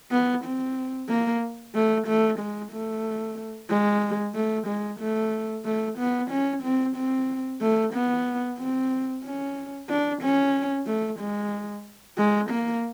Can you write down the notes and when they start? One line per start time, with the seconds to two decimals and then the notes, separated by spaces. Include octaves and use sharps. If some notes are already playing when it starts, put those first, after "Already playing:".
0.11 B3
0.44 C4
1.09 A#3
1.75 A3
2.07 A3
2.39 G#3
2.72 A3
3.70 G#3
4.35 A3
4.67 G#3
5.00 A3
5.65 A3
5.99 B3
6.30 C#4
6.63 C4
6.96 C4
7.61 A3
7.94 B3
8.59 C4
9.24 C#4
9.89 D4
10.22 C#4
10.87 A3
11.20 G#3
12.18 G#3
12.50 A#3